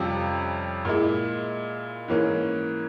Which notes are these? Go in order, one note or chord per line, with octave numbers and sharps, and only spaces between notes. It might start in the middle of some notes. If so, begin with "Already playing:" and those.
Already playing: F2 C3 G3 C#4 F4
A#2 G#3 E4
G#2 E3 A#3 C#4